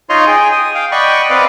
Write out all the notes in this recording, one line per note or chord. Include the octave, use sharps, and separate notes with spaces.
D#4 F4 C#5 D#5 A#5 C6
G#4 G5 G#5
D#6
F5 G5
D5 D#5 F#5 G5 B5 C#6
C4 B4 D5 D#5 F5